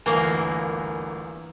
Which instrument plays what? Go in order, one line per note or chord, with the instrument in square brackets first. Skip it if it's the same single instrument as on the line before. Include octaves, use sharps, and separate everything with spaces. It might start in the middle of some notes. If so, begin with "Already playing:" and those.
[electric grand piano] G1 D2 G#5 [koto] E3 A#3